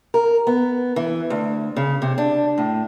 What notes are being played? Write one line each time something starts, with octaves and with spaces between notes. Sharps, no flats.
A#4
B3
E3
D2
C#3
C3
D4
A2